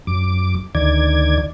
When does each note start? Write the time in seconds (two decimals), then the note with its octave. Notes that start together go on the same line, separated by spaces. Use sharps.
0.07 F#2 D6
0.75 D2 D#3 D5 G#6